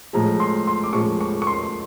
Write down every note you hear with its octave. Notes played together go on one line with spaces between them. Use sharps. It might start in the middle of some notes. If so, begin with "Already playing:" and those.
A2 F3 G#3 A#5
C6
C6
D6
A2 F3 G#3 C#6
C#6
C#6
C6